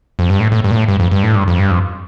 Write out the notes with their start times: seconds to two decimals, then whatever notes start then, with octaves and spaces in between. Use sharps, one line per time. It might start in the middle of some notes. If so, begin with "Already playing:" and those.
0.19 F2
0.30 G2
0.40 A2
0.52 A2
0.64 G2
0.71 A#2
0.76 A2
0.88 G2
1.00 F2
1.11 G2
1.23 A2
1.35 G2
1.48 F2
1.59 G2
1.71 F2